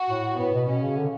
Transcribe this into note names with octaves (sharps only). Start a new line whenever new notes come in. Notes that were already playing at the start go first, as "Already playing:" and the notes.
Already playing: F#4
A2
A2 B3
B2
B2 C#4
C#3
D3